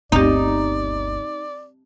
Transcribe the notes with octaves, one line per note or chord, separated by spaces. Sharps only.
G1 D2 C4 D#4 G4 D5